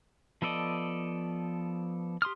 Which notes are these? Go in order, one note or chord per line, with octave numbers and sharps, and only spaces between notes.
F3 B3 A4 D5 D#5
G4 C6 D#6 F6